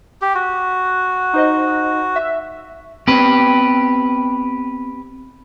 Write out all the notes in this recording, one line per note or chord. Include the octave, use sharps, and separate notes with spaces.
G4
F#4
D#4 C5 D#5
E5
B3 C4 G4 B4